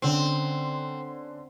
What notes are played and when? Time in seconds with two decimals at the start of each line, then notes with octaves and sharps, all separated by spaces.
0.02 D3 C4 C#4